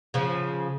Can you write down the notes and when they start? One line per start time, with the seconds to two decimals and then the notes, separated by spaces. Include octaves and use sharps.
0.14 C#3 F3